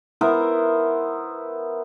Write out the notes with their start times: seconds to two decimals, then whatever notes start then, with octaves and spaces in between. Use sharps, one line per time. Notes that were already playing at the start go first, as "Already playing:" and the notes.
0.21 B3 E4 A#4 C5